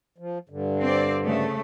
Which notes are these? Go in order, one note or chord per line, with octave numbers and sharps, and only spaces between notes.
F3
G2 D3
C4 D5
C#3 A3